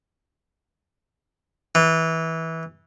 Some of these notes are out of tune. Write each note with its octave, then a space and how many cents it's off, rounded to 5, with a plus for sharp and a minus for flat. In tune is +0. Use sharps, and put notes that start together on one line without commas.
E3 -20